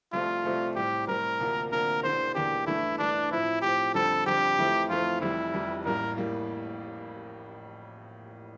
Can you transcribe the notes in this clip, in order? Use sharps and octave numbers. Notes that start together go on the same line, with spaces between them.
C2 C3 F3 A3 C4 F4
C2 C3 F3 A3 C4
A2 G3 C4 G4
A2 G3 C4 A#4
D2 C3 F3 A#3 D4
D2 C3 F3 A#3 D4 A#4
E1 E2 E3 A#3 D4 C5
E1 E2 E3 A#3 D4 G4
G2 E3 A3 E4
G2 E3 A3 D4
A2 F3 C4 E4
A2 F3 C4 G4
F2 D3 G3 C4 A4
F2 D3 G3 C4 G4
F2 E3 A3 C4 E4
F2 E3 A3 C4 E4 F4
F1 F2 E3 G3 E4
F1 F2 E3 G3
A1 A2 G3 A#3 A#4
A2 G3 A#3